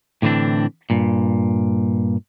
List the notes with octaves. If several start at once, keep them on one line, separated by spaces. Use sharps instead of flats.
A2 D3 E3 C4 D4
G2 A#2